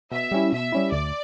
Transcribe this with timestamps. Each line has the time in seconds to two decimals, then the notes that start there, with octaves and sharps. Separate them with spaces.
0.12 B2 E5
0.31 G3 C#4 E4
0.52 B2 E5
0.72 G3 C#4 E4
0.92 D2 D5